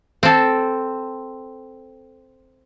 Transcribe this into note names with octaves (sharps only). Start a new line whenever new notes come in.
C4 A4